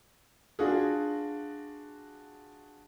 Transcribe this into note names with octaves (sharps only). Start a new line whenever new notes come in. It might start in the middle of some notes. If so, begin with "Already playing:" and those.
D4 F4 F#4 G#4